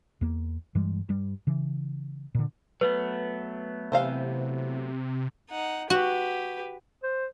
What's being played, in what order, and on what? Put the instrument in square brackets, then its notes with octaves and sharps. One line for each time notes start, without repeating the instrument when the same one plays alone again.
[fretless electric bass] E2 A#3
G2 E3 G3 G#3
G2 G3
C#3 E3
A#2 D3
[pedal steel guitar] F#3 A3 B3 [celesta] B4
[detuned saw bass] C3 [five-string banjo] E3 C5 F5
[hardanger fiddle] D#4 F#5
[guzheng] F#4 [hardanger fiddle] G4 B4
[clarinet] C5